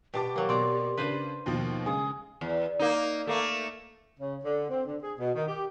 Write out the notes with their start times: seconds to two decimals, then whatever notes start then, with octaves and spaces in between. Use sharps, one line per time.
0.14 B2 G4 G5 A5 D6
0.35 F#3 A#3
0.49 B2 C4 D5 A#5 C6
0.97 C#3 D4 B4 C5 D#7
1.46 D#2 B2 F3
1.86 C#3 G#3 G#5 D#6
2.41 E2
2.79 A#3 D#4
3.27 A3 A#3
4.20 C#3
4.44 D3
4.70 C4
4.86 D3
5.02 G#4
5.19 B2
5.35 D#3
5.48 G4